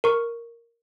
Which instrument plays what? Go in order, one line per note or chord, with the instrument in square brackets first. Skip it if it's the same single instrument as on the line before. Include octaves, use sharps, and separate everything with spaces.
[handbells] A#4 C#6